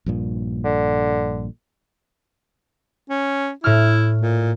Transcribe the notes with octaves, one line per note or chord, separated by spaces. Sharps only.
A#1 G2 A#2
D3
C#4
A2 E4 F6
A#2